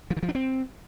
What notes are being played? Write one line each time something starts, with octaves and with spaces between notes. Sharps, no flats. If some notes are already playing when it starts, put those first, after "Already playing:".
F3
D#3
F3
D4
C4